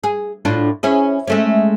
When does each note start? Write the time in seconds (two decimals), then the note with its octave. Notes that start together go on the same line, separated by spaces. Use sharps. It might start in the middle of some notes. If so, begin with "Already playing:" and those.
0.04 G#4
0.45 A2 D4 F4
0.83 C#4 E4 G#4
1.27 G#3 A3 C#4